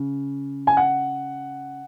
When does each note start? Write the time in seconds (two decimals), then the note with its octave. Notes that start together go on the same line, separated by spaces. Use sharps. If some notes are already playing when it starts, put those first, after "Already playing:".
Already playing: C#3
0.67 G#5
0.77 F#5